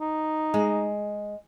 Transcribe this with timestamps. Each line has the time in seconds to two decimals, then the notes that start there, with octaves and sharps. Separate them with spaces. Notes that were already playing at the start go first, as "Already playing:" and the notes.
0.01 D#4
0.54 G#3